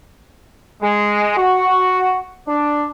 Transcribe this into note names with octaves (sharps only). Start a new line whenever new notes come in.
G#3
F#4
D4